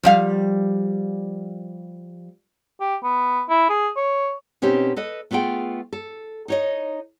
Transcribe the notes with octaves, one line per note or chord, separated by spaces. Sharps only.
F3 G3 F5
G4
B3
E4
G#4
C#5
B2 C4 C#4 D#4 G4
A4 B4 D#5
A3 B3 F4 G#4 G5
A4
D#4 C#5 D#5